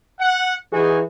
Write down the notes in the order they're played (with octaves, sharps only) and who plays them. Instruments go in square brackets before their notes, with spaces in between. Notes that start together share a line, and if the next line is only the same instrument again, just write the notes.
[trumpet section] F#5
[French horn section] E3 G#4 [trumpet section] D#4 F#4 G#5